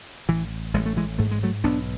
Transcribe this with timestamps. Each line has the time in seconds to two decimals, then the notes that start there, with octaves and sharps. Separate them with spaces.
0.29 A1 E3
0.74 A1 G#3
0.86 A3
0.97 E3 G#3
1.19 G#2 A3
1.31 G#3
1.43 F#3 A3
1.64 B1 B3 D4